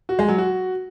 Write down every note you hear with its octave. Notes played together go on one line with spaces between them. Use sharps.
F#4
G#3
F#3
F#4